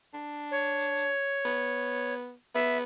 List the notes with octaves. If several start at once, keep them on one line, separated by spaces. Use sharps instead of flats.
D4
C#5
B3
B3 E5